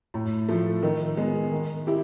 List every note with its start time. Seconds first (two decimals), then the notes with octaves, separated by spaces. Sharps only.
0.14 A2
0.49 F3 A3
0.83 D#3
1.17 G#3 B3
1.52 D#3
1.87 E4 G4